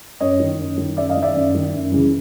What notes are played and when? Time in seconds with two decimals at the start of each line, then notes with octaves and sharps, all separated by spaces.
0.20 F#2 C#5 D#5
0.40 D#3
0.59 F#2
0.78 D#3
0.97 F#2 D5 E5
1.10 D#5 F5
1.17 D#3
1.22 D5 E5
1.35 F#2
1.55 D#3
1.73 F#2
1.92 C#3 E3